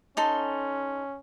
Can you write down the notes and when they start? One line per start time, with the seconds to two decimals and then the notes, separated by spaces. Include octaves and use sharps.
0.17 C#4 D#4 A4 C6